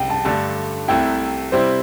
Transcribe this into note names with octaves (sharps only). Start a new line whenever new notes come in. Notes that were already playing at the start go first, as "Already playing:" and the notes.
Already playing: C2 G5
A5
G2 D3 A3 A5
C2 C3 A3 E4 G5
C3 G3 C4 E4 C5